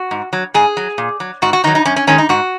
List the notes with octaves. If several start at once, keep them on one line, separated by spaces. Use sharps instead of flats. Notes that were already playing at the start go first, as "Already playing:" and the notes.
Already playing: F#4
G#2
F#3
G#2 G#4
F#3
A#2
F#3
G#2 F#4
F#4
D#3 F#3 D#4
D#4
F#2 C#4
C#4
D#3 G#3 C#4
D#4
G#2 F#4